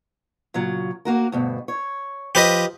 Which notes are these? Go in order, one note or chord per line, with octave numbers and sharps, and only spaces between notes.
A#2 C#3 F#3
A#3 F#4 A#4
D2 G2 B2
C#5
F3 G4 B4 D#5